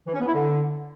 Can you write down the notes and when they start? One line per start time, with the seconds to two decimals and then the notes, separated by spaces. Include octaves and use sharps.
0.07 E3
0.14 C#4
0.20 B3
0.27 E4
0.34 D3